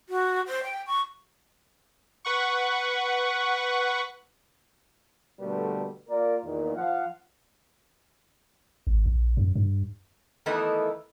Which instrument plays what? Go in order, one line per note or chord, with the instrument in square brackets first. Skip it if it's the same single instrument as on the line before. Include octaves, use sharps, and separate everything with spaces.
[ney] F#4
C5
G5
C#6
[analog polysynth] B4 F#5 C#6
[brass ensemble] B2 D3 G3 A3 A#3 B4
A#3 F4 A#4 D5
E2 A#2 D#3
F3 F5 F#5
[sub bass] G#1
A#1
F#2
G2
[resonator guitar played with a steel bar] D#3 E3 A3 B3 D#4 E4